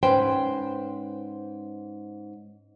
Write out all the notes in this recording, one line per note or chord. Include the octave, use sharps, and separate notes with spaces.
G#2 C#4 B4 C5 G5